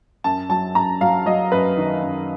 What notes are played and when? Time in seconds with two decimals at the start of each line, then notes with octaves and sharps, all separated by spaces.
0.24 F#2 A5
0.49 F#3 A5
0.75 F#2 A#5
1.01 F#3 F5
1.26 F#3 D#5
1.52 F#2 B4
1.77 D#3
2.02 F#2